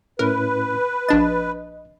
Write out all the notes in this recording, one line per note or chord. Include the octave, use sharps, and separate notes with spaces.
A2 C#4 E4 A#4 B4
A#1 D4 D#5 A6